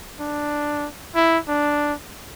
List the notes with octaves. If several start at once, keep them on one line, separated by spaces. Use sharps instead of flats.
D4
E4
D4